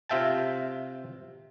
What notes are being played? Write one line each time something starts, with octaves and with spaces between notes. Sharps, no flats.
C3 F4 E5 G5 A5